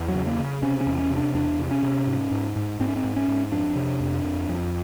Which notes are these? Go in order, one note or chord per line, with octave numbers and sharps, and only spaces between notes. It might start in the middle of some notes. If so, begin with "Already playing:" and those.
Already playing: E2
F#3
C#3
A#3
C#3
C3 C#4
C#4
E2
C#4
C3
D4
E2 D4
C3
C#4
C3
G#2
G#2
G#2
G#2 C4
C#4
C4
G#2
C#4
G#2
F2 D4
C3
F2
F2
F2